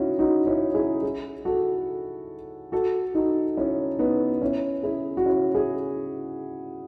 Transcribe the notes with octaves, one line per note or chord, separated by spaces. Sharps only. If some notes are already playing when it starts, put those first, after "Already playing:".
Already playing: C#4 D#4 E4 F#4
D#4 F#4
C#4 E4
E4 G#4
E4 G#4
F#4 A4
F#4 A4
D#4 F#4
C#4 E4
B3 D#4
C#4 E4
E4 G#4
F#4
C#4 E4
E4 G#4